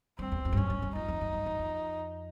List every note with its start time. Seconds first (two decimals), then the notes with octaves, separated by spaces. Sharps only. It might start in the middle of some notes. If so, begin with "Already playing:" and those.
0.19 G2 C4
0.32 E2
0.45 F2
0.52 G2
0.57 F#2 C#4
0.70 G2
0.82 G2
0.95 F2 D#4
1.08 F2
1.21 F#2
1.33 G2
1.46 F#2
1.59 F2